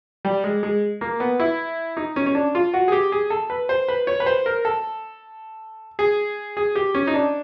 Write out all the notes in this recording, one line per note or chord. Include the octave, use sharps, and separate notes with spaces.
G3
G#3
G#3
A#3
B3
E4
D#4
C#4
C#4
D4
F4
F#4
G#4
G4
G#4
A4
B4
C5
B4
C#5
B4
C5
A#4
A4
G#4
G#4
G4
C#4
D#4
D4